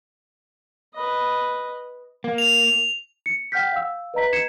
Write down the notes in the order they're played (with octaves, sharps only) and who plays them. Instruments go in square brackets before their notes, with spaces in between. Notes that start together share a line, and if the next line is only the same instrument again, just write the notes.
[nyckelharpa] B4 D#5
[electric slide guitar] A#3
[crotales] F7
F7
[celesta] C#7
F#5 G5 F6 G6 B6
F5 E6
B4 D#5 A#5 B6
G#6 C7 C#7 E7